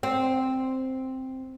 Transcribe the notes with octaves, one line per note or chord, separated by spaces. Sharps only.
C4